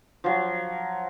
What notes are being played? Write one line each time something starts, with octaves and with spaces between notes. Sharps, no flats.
F3 F#3